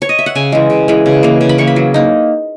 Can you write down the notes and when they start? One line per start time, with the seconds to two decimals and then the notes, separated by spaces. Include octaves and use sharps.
0.02 C#5
0.09 D#5
0.19 E5
0.26 F#5
0.35 C#3 G#5
0.52 E3 G#3
0.70 C#3
0.88 E3 G#3
1.06 C#3
1.23 E3 A#3
1.41 C#3
1.49 B5
1.58 E3 A#3 C#6
1.67 B5
1.76 F#3
1.94 A#3 D#4